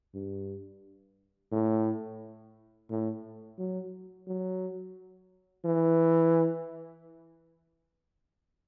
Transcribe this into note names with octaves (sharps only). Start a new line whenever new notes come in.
G2
A2
A2
F#3
F#3
E3